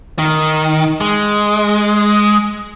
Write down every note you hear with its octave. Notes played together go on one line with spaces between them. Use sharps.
D#3
G#3